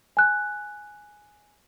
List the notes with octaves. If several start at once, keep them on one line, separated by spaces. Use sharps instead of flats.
G#5 F#6